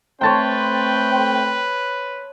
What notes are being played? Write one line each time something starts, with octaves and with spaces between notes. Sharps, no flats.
A3 C4 B4 C#5 G5 A5 C6